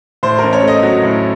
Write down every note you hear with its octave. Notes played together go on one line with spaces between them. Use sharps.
A2 C5
A#4
A1
C#5
A3 D#5
F#3
A2